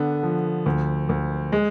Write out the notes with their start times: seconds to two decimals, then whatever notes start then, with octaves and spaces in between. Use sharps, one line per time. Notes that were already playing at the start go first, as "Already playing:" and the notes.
Already playing: D3 B3
0.23 F3
0.66 D2
1.09 D2
1.52 G#3